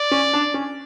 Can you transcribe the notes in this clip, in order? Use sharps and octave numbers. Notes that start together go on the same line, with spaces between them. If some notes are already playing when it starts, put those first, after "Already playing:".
Already playing: D5
C#4
D4
C#4